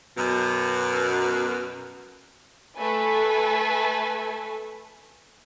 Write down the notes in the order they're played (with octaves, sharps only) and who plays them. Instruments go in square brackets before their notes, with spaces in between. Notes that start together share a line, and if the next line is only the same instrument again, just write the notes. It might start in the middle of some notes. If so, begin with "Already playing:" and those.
[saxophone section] F#2 B2
[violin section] A3 A4 B4 G#5